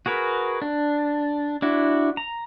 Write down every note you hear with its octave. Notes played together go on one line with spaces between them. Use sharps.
F#4 G#4 A#4 B4
D4
D4 E4 F#4
A#5